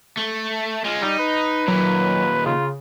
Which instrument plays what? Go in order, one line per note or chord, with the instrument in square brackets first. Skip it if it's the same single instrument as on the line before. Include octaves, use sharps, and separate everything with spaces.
[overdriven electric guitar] A3
G#3 F4
[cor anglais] G3 [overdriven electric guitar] D#4
[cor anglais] B4
[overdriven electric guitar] D#2 A#2 [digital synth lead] F#3
[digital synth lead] C#3 [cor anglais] F4